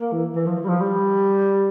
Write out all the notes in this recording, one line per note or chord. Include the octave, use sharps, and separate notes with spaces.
A#3
E3
E3
F3
E3
G3
F3
G3